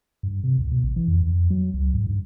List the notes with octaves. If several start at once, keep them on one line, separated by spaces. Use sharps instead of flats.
G2
C3
D2
B2
A#1
E3
F2
F2
F#3
C#2
G#2
G2